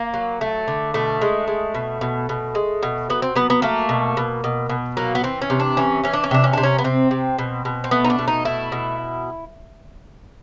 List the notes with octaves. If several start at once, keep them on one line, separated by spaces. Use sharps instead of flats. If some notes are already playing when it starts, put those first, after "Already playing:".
Already playing: A#3
F#3
A3
D3
B2 A3
G#3
G#3
B2
B2
B2
G#3
B2
F#3 B3
C4
F#3 B3
B3
A3 A#3
B2
B2
B2
B2
F#3 A#3
B3
E3 C4
C#4
C3
D4
E3 C#4
E3 C#4
D4
C#4
C3 D4
C#4
C3 D4
C#4
B3
C3 C4
C3
B2
B2
C4
A3 B3
D#4
D4
B2
D#4
A3 E4
B2